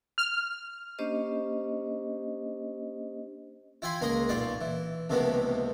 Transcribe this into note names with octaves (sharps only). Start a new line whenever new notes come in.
F6
A#3 C#4 D4 G4 C5 D#5
E4 F4 G5 G#5 B5 C6
C#2 A#3 G#4 A#4 C6 D#6
B1 A#2 F4 D5 D6
E3
C#2 C3 D#3 F3 A#3 B3